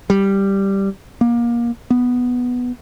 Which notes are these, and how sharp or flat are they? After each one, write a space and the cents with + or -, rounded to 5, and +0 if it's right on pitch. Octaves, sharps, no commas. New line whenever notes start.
G3 +0
A#3 +25
B3 +0